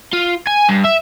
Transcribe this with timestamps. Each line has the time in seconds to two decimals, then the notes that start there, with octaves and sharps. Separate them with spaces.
0.13 F4
0.47 G#5
0.69 G2
0.84 E5